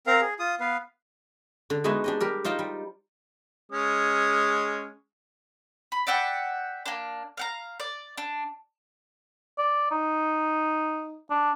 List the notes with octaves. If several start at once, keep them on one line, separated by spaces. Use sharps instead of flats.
C4 A#4 F5 A#5
G#4
F4 D#6
B3 B4 F5
D3
G#3 B3 D#4 F#4 E5 G#5
D4 G4 D#5
G3 G4 A#4
D#4 F4 C5 D#5 G5
G3
G#3 C#4 D#6
B5
D5 E5 F#5 G5
A#3 D4
F5 F#5 A#5
D5
D4
D5
D#4
D4